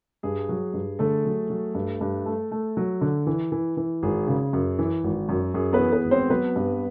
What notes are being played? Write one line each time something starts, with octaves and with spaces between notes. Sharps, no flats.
G2 G#4
F#3
G2
D3 A3 A4
F#3
F#3
G2
G2
A3
A3
F#3
D3
E3
E3
E3
G#1 G#4
C#3
F#2
E3
G#1
F#2
F#2 G#4
B3 B4
E3
B3 B4
G#1
C4 C5
F#3 B3 B4
G2